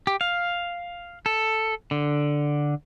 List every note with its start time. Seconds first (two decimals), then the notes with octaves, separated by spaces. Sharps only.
0.07 G4
0.21 F5
1.26 A4
1.91 D3